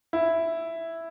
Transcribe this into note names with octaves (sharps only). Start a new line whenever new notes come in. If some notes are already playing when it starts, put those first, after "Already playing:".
E4